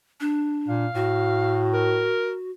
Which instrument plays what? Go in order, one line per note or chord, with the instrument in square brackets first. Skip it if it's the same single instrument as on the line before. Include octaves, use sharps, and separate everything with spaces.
[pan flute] D4
[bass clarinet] A#2 [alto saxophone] F5
[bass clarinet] A2 [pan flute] F#4
[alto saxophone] A#4